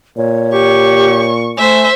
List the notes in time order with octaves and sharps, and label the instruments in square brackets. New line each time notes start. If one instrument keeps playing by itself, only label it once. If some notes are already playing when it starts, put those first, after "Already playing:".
[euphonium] A#2 [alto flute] C#5
[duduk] G4 [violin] C#6
[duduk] A3 [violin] C5 E5 [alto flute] G#5